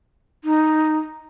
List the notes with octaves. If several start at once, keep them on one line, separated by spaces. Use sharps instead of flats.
D#4